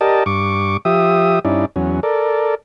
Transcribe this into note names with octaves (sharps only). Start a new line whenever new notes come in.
G4 A#4 D5 D#5 A5
G2 C#6 D6
F3 G4 E5 D#6
G2 C#4 D#4 E4 D5
E2 F#3 C#4
A4 A#4 D5